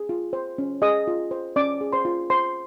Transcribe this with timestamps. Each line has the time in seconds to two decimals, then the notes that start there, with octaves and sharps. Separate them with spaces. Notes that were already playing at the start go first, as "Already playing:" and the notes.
Already playing: G#4
0.09 F4
0.33 C5
0.58 C#4
0.82 G#4 D#5 D#6
1.07 F4
1.31 C5
1.56 C#4 D5 D6
1.81 G#4
1.93 C5 C6
2.05 F4
2.30 C5 C6